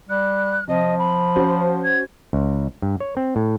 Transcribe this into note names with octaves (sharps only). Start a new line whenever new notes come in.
G3 F#6
C3 F3 D#5
B5
C#4 F#4 C5
G#6
C#2
G2
C#5
C4
A2